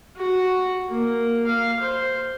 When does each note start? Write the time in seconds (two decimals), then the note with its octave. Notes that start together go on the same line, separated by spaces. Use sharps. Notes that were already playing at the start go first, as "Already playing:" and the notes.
0.17 F#4
0.89 A#3
1.46 F5
1.80 C5